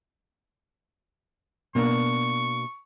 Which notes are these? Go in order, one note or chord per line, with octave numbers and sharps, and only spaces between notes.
B2 A#3 D4 C#6